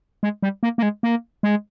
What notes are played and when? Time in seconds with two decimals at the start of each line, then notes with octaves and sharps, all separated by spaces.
0.23 G#3
0.43 G3
0.63 A#3
0.78 A#3
0.83 G#3
1.03 A#3
1.43 G#3